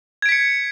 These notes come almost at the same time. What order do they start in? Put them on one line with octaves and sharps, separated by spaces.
G#6 D7 B6 C#7